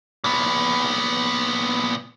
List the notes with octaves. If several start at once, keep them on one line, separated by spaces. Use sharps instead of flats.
A#2 B3